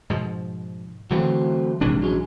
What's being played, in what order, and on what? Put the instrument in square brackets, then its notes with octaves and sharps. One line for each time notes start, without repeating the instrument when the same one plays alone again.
[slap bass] G#2 B2 F3
[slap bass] D3 E3 [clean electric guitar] F#3 A3 C4
[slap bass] A#1 E3 D4 [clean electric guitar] G#2 C3
[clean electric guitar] F#3 G#3 C#4